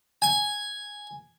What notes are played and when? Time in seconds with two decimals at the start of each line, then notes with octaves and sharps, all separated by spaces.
0.22 G#5